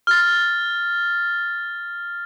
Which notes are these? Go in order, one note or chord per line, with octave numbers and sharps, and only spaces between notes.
F6 A6